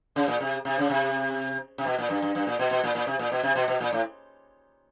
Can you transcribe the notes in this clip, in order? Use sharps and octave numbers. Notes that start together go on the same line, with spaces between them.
C#3
A#2
C3
C3
C#3
C3
C3
B2
A#2
G2
G2
G2
A#2
B2
B2
A#2
A#2
C3
A#2
B2
C3
B2
B2
A#2
A2